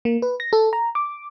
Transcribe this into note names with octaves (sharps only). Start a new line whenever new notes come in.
A#3
B4
A#6
A4
A#5
D6